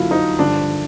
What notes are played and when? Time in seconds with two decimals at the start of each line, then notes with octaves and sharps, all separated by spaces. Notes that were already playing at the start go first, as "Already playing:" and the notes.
Already playing: F#2 D3 F#3 A#3 E4 F4
0.11 D#4
0.38 G2 D3 F3 D4